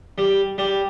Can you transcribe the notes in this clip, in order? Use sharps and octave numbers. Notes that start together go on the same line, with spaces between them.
G3
G3